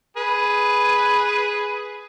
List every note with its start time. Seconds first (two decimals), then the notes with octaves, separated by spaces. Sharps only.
0.17 G#4 B4